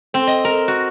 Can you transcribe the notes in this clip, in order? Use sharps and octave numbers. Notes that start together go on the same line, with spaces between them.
C4
D#5
A#4
F#4